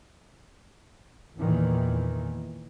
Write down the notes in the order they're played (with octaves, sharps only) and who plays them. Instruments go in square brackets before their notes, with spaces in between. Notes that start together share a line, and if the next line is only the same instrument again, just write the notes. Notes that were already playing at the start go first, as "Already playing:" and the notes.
[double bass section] E2 A#2 D#3 E3